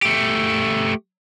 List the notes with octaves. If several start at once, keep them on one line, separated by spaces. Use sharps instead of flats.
A3 G4